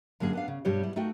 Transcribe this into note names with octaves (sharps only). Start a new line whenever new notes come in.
F#2 D3 A#3 G#4
B3 D4 F5
C#3
G2 B2 G3 G4 C#5
G3 E4
A3 D#4 F4 F#4 G5